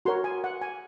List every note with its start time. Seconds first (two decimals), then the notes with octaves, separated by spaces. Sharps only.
0.05 F#4 A#4 C#5 C6
0.24 G#5
0.44 F#5
0.61 G#5